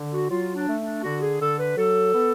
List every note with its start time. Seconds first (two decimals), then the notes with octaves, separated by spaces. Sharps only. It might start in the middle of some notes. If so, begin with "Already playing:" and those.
Already playing: D3
0.12 F#4
0.30 F#3 F4
0.54 D4
0.67 A3
0.79 D4
1.03 D3 F#4
1.21 G#4
1.39 D3 A4
1.58 B4
1.76 F#3 A4
2.13 B3